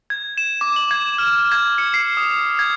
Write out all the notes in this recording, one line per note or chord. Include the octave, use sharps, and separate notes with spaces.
G#6
E7
D6
F#7
G#6
F6
G#6
C#7
C7
D#6
G#6